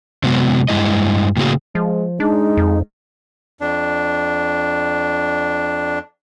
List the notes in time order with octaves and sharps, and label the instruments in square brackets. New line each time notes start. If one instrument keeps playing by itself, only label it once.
[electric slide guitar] C3 F#3 G#3 B3
G2 G#3 E4 D#5
A2 C#3 A#3 F#4 G#4
[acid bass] F3 [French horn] G#3
[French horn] G#3 [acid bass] D4 [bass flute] D#4
[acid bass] F2
[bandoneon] F2 D4